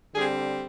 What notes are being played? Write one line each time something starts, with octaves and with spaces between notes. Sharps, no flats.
D3 G3 C4 G#4